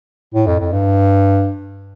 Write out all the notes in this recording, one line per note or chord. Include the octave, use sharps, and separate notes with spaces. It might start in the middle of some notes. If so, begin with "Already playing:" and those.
A2
F2
F2
G2